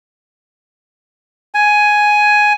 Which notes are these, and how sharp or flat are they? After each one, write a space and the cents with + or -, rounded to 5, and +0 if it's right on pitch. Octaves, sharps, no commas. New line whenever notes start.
G#5 +10